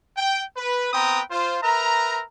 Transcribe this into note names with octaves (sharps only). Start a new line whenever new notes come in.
G5
B4
B3 C4 B4 G5 A#5 D#6
F4 C5
A#4 B4 E5 A#5